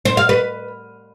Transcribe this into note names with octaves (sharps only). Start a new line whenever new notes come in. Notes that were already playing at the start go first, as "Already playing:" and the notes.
C5
F5
B4